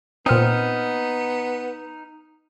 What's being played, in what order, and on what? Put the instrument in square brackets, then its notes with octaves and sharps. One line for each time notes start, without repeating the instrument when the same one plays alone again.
[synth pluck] A#2 C4 [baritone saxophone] B3 [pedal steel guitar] D#4 F6